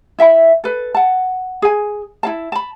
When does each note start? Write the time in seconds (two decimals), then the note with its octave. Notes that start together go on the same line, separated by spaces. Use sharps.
0.19 E4 E5 G5 B5
0.64 A4 B4
0.95 F#5 A5
1.62 G#4 G#5
2.23 E4 F5 A5
2.52 A5 B5